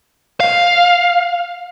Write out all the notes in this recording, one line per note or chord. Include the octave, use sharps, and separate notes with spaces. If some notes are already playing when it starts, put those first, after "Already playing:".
F5